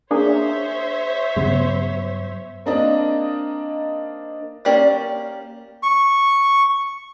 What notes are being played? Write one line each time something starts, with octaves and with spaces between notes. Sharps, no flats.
A#3 D4 G#4 C5 C#5 E5
G2 C#3 F#3 B3
A#3 C4 D4 D#4 D5 D#5
A#3 C#4 G4 D5
C#6